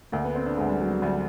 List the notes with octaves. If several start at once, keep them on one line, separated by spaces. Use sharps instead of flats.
D2 D3 A#3
B3
C4
D4
D2 D3 G#3
G3
F#3
F#3
D2 D3 G3